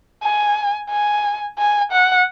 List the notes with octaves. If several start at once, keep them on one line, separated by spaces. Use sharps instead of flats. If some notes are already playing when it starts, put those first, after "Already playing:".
G#5
G#5
G#5
F#5